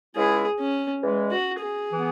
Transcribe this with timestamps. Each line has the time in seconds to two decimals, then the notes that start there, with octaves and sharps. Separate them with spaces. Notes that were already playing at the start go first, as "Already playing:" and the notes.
0.15 C#2 C#3 G#3 E4 G#4
0.59 C#4
1.02 E2 E3 G#3
1.31 F#4
1.60 G#4
1.91 E3 B3